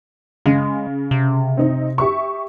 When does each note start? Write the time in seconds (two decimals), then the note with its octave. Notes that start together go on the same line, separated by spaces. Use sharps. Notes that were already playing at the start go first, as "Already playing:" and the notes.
0.46 C#3 G#3
1.11 C3
1.57 C4 D#4
1.98 G4 E5 C#6